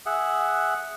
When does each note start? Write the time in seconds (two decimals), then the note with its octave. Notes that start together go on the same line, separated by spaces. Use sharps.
0.06 G#4 E5 F#5